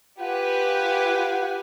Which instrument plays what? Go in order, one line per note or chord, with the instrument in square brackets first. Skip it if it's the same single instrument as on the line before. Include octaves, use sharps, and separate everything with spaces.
[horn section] F4 F#5 [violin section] G4 B4 G#5